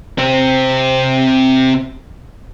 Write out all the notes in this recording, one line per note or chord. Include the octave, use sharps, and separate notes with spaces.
C3 C4